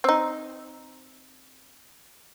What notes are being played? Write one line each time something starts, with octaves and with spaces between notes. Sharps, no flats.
C4 D#4